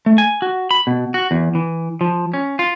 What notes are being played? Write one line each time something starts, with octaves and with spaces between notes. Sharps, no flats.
A3
G#5
F#4
B5
B2
F#4
E2
E3
F3
C#4
F4